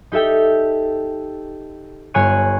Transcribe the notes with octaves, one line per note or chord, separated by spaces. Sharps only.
D#4 G4 A4 E5 G5
G1 C#5 G#5 C#6 F#6 D#7